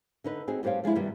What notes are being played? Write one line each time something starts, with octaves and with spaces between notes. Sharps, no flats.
D3 D#4 B4
C4 D#4 F#4 G#4
G2 G3 G4 C5 C#5 F5
F3 G#3 D4 E4
G2 C3 D#3 F#3 G3